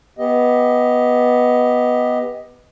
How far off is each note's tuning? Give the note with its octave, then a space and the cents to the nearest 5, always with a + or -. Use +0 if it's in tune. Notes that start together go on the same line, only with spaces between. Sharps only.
B3 +0 G4 +15 D#5 +10